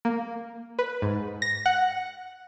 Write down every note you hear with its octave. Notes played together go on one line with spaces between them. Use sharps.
A#3
B4
G#2
A#6
F#5